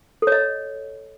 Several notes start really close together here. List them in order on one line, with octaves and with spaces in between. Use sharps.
A4 C#5 D#5